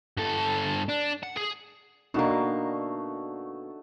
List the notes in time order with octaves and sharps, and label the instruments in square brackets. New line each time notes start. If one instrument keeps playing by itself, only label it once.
[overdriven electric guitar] G2 A4
D4
F#5
G#4
[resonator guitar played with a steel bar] B2 A#3 [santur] A3 F#4 [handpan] D4 D#4